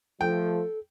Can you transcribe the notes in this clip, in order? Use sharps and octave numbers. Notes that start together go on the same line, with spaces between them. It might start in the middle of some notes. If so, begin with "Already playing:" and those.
F3 A3 A4 G5